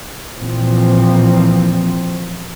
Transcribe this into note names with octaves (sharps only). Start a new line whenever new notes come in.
A#2 E3 F3 C4